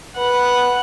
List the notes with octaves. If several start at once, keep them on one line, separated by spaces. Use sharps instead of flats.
B4 F#5